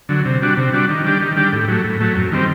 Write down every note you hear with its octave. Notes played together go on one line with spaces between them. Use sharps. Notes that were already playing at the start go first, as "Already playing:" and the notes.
D3 F#3
C3
G3 D4 F#4
C3
G3 D4 F#4
D#3
G3 D4 G4
D#3
G3 D4 G4
A2
F#3 A3
A2
F#3 A3
F#2
D#3 G3 C4